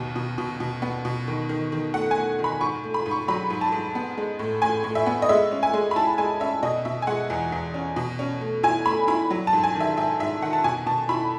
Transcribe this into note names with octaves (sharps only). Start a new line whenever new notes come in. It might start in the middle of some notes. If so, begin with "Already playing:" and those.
Already playing: D#2 B2
B2
B2
B2
B3
B2
D#3
D#3
D#3
A3 F#5
G#5
A3
D#3
B5
G#2 C#6
A3
B5
G#2
C#6
F#3 B5
G#2
A5
G#2
B3
G#3
A2
A2 G#5
A2
E5
B3
D#5
G#3 E5
C#4
G#5
G#3
B5
E4 A5
G#3 G#5
C#4 E5
B2 D#5
B2 E5
G#5
G#3 F#5
E2
E2
C#4
B2
C#4
A3
E4 G#5
A3 B5
E4 B5
F#3
A5
G#2
G#5
D#3
E5
G#2 E5
G#2 E5
D#3 F#5
A5
B2 G#5
B2 A5
E4 B5